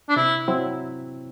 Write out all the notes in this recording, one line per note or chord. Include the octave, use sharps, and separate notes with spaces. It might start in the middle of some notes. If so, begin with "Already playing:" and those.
D4
C3 E4
F#3 C4 E4